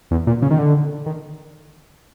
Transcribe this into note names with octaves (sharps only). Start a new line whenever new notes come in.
E2
A#2
C#3
D#3
D3
D#3